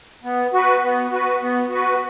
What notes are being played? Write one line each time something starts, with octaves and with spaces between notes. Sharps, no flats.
B3
F#4 B4
B3
F#4 B4
B3
F#4 B4